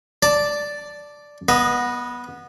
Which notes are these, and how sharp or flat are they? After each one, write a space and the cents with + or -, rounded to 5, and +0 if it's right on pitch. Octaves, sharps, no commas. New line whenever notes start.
D5 +0 A5 +0
B3 -15 D#5 +0